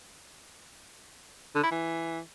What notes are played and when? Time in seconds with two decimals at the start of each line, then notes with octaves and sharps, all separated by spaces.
1.55 D3
1.63 E4
1.71 E3